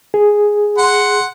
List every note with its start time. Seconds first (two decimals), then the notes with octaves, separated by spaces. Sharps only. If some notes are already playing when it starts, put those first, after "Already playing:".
0.14 G#4
0.78 F#5 C6